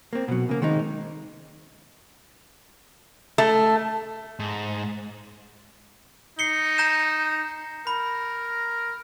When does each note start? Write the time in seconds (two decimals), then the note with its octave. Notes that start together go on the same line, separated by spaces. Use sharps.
0.13 A#3 C4
0.28 B2 F#3
0.49 C#3 A#3
0.62 D#3 G#3 C4 D#4
3.38 A3
4.40 G#2
6.39 D#4 C7 C#7 G7
6.78 A#5 G6 E7
7.87 A#4 B5